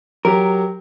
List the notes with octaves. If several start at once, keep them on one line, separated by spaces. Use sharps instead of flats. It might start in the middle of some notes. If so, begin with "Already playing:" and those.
F#3 G4 A#4